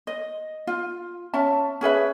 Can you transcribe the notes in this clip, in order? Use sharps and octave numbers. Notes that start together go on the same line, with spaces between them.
D#5
F4
C#4 E5 A5
C#4 G#4 B4 E5